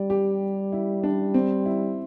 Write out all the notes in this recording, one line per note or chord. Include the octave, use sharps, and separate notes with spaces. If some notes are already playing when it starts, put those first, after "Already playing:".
Already playing: G3 D5
G4
E4
D4
C4
E4